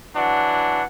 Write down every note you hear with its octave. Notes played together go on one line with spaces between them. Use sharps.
E3 F#3 D4 F#5